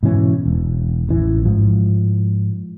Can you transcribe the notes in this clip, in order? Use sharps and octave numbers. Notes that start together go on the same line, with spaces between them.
G#2 B2 E3 C#4
E1
A1 E3
G#2 F3